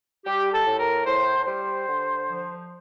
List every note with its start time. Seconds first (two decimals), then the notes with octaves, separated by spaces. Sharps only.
0.25 G3 G4
0.52 A4
0.65 A2
0.79 A#4
1.05 A2 C5
1.46 G3 C5
1.87 D3
2.27 F3